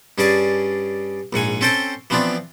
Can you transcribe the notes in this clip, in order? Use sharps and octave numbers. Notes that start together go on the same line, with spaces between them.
G2 C#4 G#4 D5 A5
A#1 G#2 F#5 G#5
C4 C#4 A4 C5 G5 A5
E3 F3 B3 C4 D4